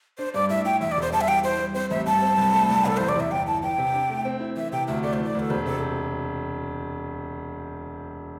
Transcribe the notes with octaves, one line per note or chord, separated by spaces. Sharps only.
D4 C5
G2 D5
A2 E5
E4 G5
E2 E5
D5
E1 C5
G3 A5
E5
E2 G5
E4 C5
G3
C4 C5
A1 E5
G2 A5
C4
C2
A3
C2
C3 A4
E2 C5
D5
E2 E5
G1 G5
E3 A5
E3 G5
C3
D4
A3
C4
E4
E3 E5
C3 G5
D2 E5
A3 D5
C5
E3
D5
D2 A4
E1 C5
C3 A4